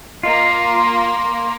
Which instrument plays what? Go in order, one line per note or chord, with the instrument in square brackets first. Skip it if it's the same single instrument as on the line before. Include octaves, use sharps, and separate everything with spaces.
[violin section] A#3 [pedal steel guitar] F4 [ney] D#5
[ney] C6